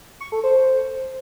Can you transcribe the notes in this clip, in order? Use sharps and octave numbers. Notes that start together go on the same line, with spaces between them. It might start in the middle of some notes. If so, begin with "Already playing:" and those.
C#6
A4
C5